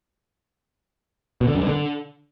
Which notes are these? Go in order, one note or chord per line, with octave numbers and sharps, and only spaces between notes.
B2
D3
F#2
G2
D3